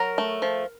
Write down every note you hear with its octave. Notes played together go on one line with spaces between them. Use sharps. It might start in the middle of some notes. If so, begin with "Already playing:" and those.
Already playing: F#3 A#4
A3
F3